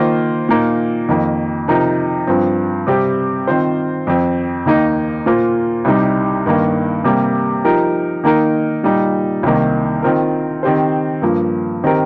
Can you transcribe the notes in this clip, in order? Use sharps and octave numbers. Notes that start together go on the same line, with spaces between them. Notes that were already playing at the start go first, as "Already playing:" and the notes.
Already playing: D#3 A#3 F4 C5
A#2 A#3 D#4
F2 D#3 A#3
C3 F3 D#4 A#4
G2 F3 C4
C3 G3 C4 G4
D#3 C4 F4 C5
F2 F3 C4
D#2 D#3 A#3 D#4
A#2 A#3 F4 C5
C2 C3 G3 D#4
G2 D#3 A#3
C3 G3 A#3
F3 D#4 G4 A#4
D#3 A#3 D#4 A#4
A#2 G3 D#4
C2 C3 D#3 A#3
D#3 C4 F4 A#4
D#3 C4 G4 C5
G2 F3 A#3
D#3 C4 G4 A#4